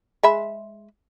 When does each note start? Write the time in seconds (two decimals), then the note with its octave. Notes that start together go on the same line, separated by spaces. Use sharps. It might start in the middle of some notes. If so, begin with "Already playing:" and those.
0.23 G#3 E5 B5